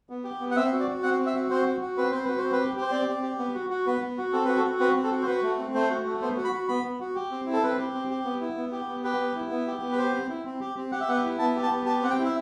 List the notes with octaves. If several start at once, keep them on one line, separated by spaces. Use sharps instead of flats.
B3
G4
B3
F#5
C4 E5
F#4
D5
F#4
C4 F#5
C4
E5
F#4
C4 C5
F#4
F#4
C4 B4
C4 C5
F#4 B4
C5
C4
B4
G4
G4
C5
C4 D5
C4
G4
B3
F#4
F#4
B3 B4
B3
F#4
C4 A4
F#4 B4
A4
F#4
C4 B4
C4
A4
F#4
C5
F#4 B4
A3
C4
A3 C5
F#4
A3
B3 C5
F#4
B5
F#4
B3 B5
B3
F#4
G4
C4
E4
A4
C4 B4
G4
C4
G4
B3
E4
B3
G4
B3
G4 B4
B3
E4
B3
G4
B3
B4
G4 C5
C4
E4
C4
G4
C4
G4 F#5
E5
B3 F#5
E4
B3 A5
G4
A5
B3
G4 A5
C4 F#5
G5
E4
E5